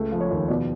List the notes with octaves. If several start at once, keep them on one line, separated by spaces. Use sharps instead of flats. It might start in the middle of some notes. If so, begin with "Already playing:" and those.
Already playing: C#2 A3
F3
C#5
D#2
B2 D5